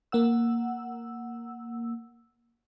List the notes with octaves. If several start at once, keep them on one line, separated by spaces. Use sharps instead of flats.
A#3 F#5 E6